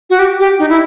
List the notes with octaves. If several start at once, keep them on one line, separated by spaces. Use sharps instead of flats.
F#4
G4
G4
D#4
E4